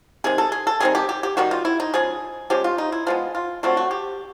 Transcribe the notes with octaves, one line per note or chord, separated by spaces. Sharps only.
C3 D#3 G#3 G#4
A4
G#4
A4
D#3 G3 C4 D#4 G#4
G4
G4
G4
D#3 G3 A#3 D#4 F#4
F4
E4
D#4
C#3 F3 G#3 G#4
F3 G#3 C#4 G4
F4
D#4
E4
F3 G#3 B3 F4
F4
D3 F#3 A3 C4 F4
F#4
G4